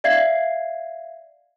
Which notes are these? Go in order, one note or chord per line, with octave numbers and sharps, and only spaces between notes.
D5 E5 F5 G#6 C7